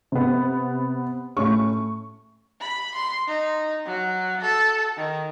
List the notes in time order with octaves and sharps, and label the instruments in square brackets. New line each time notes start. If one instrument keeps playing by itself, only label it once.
[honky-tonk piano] C3 B3
[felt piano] A2 A3 C#4 [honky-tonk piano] C#6
[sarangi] B5
C6
D#4
F#3
A4
D#3